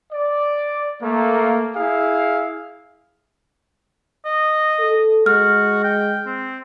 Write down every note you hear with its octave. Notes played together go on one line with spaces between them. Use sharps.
D5
A3 A#3
E4 G#4 F5
D#5
A4
G#3 F#4 F6
G5
C4